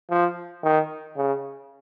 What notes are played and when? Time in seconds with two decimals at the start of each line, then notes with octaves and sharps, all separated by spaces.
0.10 F3
0.63 D#3
1.16 C#3